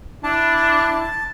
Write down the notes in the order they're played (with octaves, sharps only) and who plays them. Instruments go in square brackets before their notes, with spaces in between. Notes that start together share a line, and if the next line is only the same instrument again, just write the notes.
[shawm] D4 [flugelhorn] E4 [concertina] A5